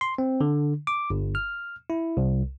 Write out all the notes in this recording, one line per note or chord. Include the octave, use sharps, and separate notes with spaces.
C6
C4
D3
D6
G1
F6
E4
C2